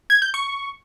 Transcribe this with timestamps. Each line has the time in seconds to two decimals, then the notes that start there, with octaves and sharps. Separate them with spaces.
0.10 G#6
0.22 G6
0.34 C#6